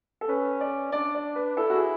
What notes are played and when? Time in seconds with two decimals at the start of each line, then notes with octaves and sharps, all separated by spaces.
0.21 A4
0.29 C#4 B4
0.61 D5
0.92 D4 D5
1.15 D5
1.36 B4
1.57 E4 A4
1.70 F#4
1.74 G#4